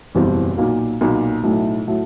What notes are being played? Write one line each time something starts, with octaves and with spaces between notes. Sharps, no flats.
F#1 E2 B2 G3 C4
B1 A#2 F#3 A#3
B1 A#2 F#3 A#3
B1 A2 F#3 A3
A2 F#3 A3